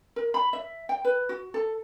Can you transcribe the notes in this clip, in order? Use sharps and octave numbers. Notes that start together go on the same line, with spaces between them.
A#4
B5
E5
G5
B4
F#4
A4